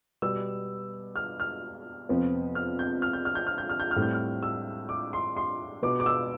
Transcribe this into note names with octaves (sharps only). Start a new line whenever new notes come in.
B2 G3 B3 E6
F6
F6
F2 C3 F3 B3
F6
G6
F6
G6
F6
G6
F6
G6
F6
G6
F6
A2 G3 C4
G6
F6
E6
D6
C6
C6
B2 B3 D6
D6
E6